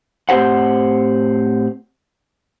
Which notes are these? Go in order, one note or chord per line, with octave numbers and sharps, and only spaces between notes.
A2 C4 G4 C5 F#5